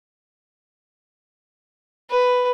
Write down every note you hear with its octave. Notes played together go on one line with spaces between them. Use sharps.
B4